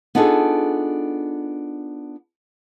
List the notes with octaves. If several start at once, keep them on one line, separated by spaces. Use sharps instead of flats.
B3 D4 D#4 F4 G#4 A4